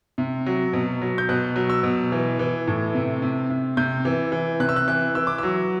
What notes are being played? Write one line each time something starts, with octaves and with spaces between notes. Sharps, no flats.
C3
F#3
B2
F#3
G6
B2 F#6
F#3
E6
B2
E3
E3
A2
C3
C3
C3
C3 G6
E3
E3
C3 F#6
E6
F#6
E3 F#6
E3 E6
D6
F#3 E6